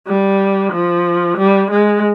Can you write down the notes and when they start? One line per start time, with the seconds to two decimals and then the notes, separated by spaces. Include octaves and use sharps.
0.08 G3
0.73 F3
1.38 G3
1.72 G#3